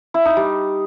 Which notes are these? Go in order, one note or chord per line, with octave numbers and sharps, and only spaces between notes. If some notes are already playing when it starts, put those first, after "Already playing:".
E4
D#4
G3